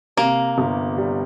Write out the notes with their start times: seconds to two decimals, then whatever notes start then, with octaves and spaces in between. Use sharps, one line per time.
0.17 C3 A#3
0.58 G1
0.97 G3